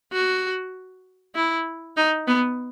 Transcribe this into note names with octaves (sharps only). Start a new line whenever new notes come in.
F#4
E4
D#4
B3